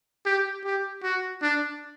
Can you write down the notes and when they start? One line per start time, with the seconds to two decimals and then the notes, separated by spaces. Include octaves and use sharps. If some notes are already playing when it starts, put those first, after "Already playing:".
0.25 G4
0.65 G4
1.03 F#4
1.42 D4